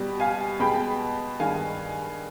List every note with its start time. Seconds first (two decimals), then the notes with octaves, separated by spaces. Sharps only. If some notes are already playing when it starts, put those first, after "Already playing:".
Already playing: B2 G3
0.20 F5 G#5
0.60 B2 G#3 G5 B5
1.39 G2 D#3 G#3 F5 G#5